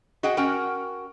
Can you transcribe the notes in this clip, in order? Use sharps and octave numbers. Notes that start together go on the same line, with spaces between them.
F#4 G#4 D#5 F#5 G5
C#4 F#4 A#4 F#5 G5